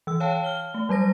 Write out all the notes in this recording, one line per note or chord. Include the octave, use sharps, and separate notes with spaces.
E3 E6
C#5 F5 G5 A5
F6 G7
A3
F#3 G3 C5 A#6